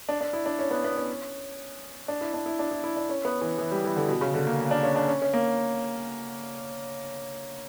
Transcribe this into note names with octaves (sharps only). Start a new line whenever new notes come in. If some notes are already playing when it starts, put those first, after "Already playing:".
D4
D4
E4
D4
C#4
B3
B3
C#4
D4
E4
D4
E4
D4
E4
E4
D4
C#4
B3
E3
E3
G3
E3
D3
B2
C#3
D3
A#3
D4
C#4
D4
C#4
C#4
A#3